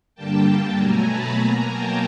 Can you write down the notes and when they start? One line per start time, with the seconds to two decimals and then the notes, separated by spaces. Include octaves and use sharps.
0.15 G2 D3 G3 A#3 G5 A5
0.77 B2 F#3 A3 G#5 A#5
1.08 A5 B5
1.38 B2 F#3 A#3 G#5 A#5
1.69 G5 A5